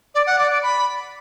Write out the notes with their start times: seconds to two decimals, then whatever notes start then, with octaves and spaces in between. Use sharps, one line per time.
0.15 D5
0.27 F#5
0.39 D5
0.50 D5
0.62 B5